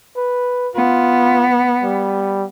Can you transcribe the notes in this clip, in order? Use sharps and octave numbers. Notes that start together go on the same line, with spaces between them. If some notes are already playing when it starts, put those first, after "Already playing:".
B4
B3 F4
G3